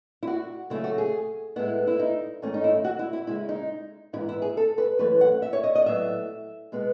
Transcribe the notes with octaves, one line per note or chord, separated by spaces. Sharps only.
E4
F#4
C#3 F#3 A3 C#4 E4
F#4
G#4
A2 G#3 B3 E4
E4
D#4
G#2 D#3 A3 C#4
D#4
E4
F#4
E4
E4
C#3 G#3 C#4 E4
D#4
G#2 E3 B3 E4
E4
G#4
A4
B4
F#2 E3 A3 C#4 B4
F#5
E5
C#5
D#5
D#5
A2 F#3 B3 E5
B2 G#3 B3